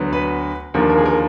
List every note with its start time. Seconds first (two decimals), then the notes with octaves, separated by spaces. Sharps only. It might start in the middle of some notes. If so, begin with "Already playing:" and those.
Already playing: D2 D3 F#3 B3
0.13 B4
0.74 D#2 D3 F3 A#4
0.90 A#4
0.98 G#4
1.06 A#4